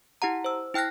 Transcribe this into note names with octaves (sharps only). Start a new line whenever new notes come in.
E4 G4 F#5 A#5
C5 E6
E4 G5 F6 F#6 A#6